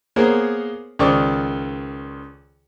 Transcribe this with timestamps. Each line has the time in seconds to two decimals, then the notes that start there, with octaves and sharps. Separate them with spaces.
0.16 A#3 B3 G#4 A#4 C5 C#5
0.99 C#2 D#3 A4 C5 D5 C#6